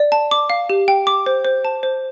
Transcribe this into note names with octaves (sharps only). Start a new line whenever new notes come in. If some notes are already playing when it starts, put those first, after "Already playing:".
Already playing: D5
A5
D6
F5
G4
G5
D6
C5
C5
A5
C5